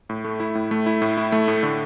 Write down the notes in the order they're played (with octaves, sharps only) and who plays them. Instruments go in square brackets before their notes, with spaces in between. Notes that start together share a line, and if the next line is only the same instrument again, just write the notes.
[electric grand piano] A2
A3
E4
A2
A3
E4
A2
E4
A3
A2
D3